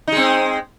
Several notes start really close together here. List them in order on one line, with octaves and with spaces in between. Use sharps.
D#4 G#3 C4